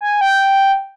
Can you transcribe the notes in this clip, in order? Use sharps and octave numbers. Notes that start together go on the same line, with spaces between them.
G#5
G5